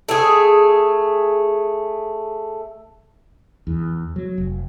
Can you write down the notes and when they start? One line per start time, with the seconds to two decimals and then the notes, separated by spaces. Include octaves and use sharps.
0.09 A3 G#4
3.67 E2
4.16 F#3
4.38 F1